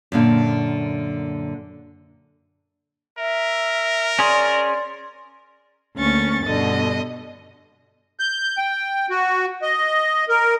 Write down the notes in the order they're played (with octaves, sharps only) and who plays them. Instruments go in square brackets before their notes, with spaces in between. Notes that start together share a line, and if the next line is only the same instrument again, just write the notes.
[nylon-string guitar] F#2 A#2 D3
[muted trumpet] A#4 [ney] E5
[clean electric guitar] C#4 G#4 [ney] D5 [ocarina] C6
[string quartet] D2 A#3 C#4 C#6 A6
G2 B2 D3 D#5
[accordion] G6
G5
F#4
D#5
A#4